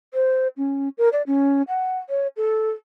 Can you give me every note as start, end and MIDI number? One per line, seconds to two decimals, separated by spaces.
0.14 0.48 72
0.57 0.89 61
0.98 1.09 70
1.13 1.22 74
1.27 1.62 61
1.68 1.98 78
2.10 2.27 73
2.37 2.70 69